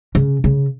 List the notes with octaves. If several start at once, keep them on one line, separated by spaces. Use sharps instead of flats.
C#3
C#3